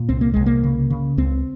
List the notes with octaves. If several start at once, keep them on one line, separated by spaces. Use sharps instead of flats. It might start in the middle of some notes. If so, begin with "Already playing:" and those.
Already playing: A#2
C2 C4
A#3
C2 G#3
A#3
C#3
C#3
C#2 C4